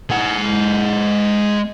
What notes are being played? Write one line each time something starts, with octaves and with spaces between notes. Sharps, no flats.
G#3 F#5